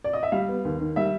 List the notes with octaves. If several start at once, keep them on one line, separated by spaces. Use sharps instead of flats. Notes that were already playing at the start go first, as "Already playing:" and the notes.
D5
D#5
E5
G3 F5
B3
D#2
D#3
G3 E5